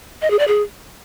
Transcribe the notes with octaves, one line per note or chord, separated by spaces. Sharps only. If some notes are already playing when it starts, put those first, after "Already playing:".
D#5
G#4
D5
G#4